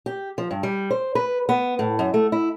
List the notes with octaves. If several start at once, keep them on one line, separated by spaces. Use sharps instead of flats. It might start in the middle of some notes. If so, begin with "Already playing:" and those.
G4
F3
G2
G3
C5
B4
B3
A2
F#2
A3
E4